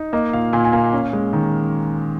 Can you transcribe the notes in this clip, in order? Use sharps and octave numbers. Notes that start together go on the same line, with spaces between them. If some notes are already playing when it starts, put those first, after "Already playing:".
Already playing: D#4
A#3 D#5
A#2 F5
A#2 G#5
G#5
A#3 F5
C#4
G#3
D#3